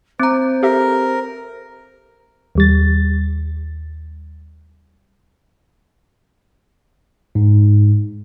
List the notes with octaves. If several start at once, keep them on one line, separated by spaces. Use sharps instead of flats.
C4 C5 A#5
G4 A4 A#4 E5
D#2 G3 A6
G#2